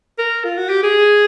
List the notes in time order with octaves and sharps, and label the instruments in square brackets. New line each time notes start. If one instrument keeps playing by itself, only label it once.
[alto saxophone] A#4
F4
F#4
G4
G#4